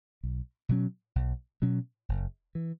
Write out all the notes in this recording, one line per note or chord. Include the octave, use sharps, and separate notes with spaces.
B1
B2 F#3 C#4
B1
B2 F#3 C#4
F#1
E3